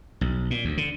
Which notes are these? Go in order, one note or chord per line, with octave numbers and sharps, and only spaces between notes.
B1
A#2
D2
D3